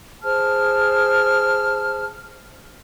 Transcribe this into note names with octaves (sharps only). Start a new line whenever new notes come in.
G#4 C5 A5 F6